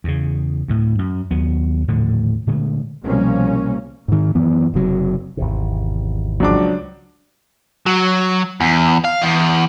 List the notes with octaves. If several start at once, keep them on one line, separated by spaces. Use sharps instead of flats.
E2 C#3
D2 A2
F#2
D#2 F#3 B3
D#1 A2 D3 F3
A#2 D3 G#3 A3
C2 B2 F3 G3 A#3 C#4
G#2 D#3
F#2 E3 B3
F#1 C3 F#3
G#1 E2 C3
C#2 F3 F#3 D4 D6
F#3
E2
F5
E2